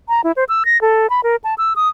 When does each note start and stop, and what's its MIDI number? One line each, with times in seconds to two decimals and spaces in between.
0.09 0.21 82
0.24 0.32 64
0.36 0.44 72
0.49 0.63 88
0.65 0.80 94
0.81 1.09 69
1.10 1.21 83
1.24 1.36 70
1.44 1.55 81
1.58 1.73 88
1.76 1.89 87